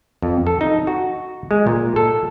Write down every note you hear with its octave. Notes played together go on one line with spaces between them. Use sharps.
F2
A4
D#4
F#4
G#3
A#2
A4